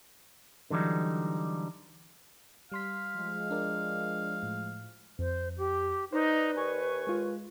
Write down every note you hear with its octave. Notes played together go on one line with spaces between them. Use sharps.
D3 E3 F#3 G3 D#4
G3 F5 C6 B6
F3 G#3
D4 A#4 D5
A2
F2 C5
G4
D#4 B4 C5 D5
D#2 G#5 C#6
G#3 F4